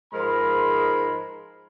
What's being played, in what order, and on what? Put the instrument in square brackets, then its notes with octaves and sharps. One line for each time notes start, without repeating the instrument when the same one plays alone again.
[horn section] G#2 F3 G#3 A#4 B5 C6